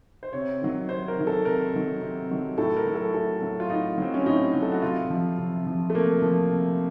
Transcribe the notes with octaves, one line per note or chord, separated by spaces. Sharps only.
C5
C3 C#5
D#3 F#3
C3 C5
A#4
D#3 F#3
A4
C3 A#4
D#3 F#3
C3
D#3 F#3
A2 A4
A#4
F#3
A4
A2 A4
F#3
F4
A2 D#4
F#3 C4
C#4
A2 D#4
F#3
A4
F#4
C3 F4
F3
C3
F3
A3
C3 A#3
F3
C3